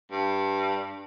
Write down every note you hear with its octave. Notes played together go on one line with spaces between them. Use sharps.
G2